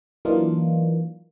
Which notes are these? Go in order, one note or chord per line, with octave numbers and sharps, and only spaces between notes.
E3 F#3 A#3 D4 D#4 F4